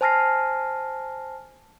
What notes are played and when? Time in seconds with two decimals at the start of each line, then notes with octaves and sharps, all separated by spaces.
0.01 C5 G#5 A5 F6 A#6 C7